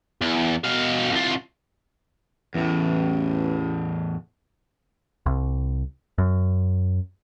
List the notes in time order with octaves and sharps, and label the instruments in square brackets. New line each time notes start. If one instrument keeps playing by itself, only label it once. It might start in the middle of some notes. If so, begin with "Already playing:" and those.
[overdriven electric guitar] E2
B2 F5
C2 F4
[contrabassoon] A1 [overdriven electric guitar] E2 A2 [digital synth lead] E3
[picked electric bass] C2
F#2